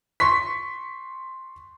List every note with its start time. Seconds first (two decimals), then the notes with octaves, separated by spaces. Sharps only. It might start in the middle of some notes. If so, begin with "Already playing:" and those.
0.20 C6 C#6 B6